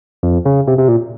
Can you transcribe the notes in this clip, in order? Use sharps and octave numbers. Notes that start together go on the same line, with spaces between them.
F2
C#3
C3
C3
A#2